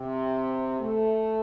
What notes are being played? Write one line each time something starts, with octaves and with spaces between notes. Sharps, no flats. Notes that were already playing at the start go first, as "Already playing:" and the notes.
Already playing: C3
A3